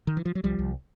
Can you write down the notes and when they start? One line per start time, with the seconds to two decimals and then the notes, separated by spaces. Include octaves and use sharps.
0.07 D#3
0.17 E3
0.26 F3
0.35 F#3
0.44 C2 F3 G3
0.59 C2